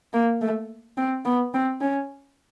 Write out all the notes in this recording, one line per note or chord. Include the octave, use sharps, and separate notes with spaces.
A#3
A3
C4
B3
C4
C#4